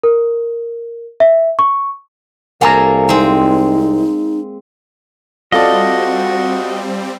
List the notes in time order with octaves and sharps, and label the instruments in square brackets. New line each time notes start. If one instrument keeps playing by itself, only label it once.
[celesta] A#4
E5
C#6
[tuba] C2 [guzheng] A#3 G#4 A4 [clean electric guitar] F5 G#5 A#5
[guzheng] G#3 C4 [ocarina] D#4
[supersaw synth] G3 C4 [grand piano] F4 A4 D5 [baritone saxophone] F#4 [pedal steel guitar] D#5